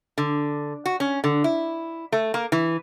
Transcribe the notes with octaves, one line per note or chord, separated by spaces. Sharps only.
D3
F#4
C#4
D3
E4
A3
A#3
E3